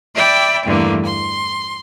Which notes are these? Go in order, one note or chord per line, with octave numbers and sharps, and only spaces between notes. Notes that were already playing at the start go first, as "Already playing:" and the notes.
D5 E5 G5 B5
E2 G2 D3 E3 A3 A#3
C6